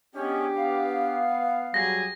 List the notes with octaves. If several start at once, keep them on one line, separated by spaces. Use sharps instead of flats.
G#3 B3 C#4 D4 G4
B3 F5
F#3 G3 G#4 A#6